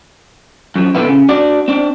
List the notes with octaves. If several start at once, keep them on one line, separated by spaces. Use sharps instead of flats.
F#2 F3
A#2 D3 A#3 B3 E4
C#3
D4 F#4 D5
C4 D4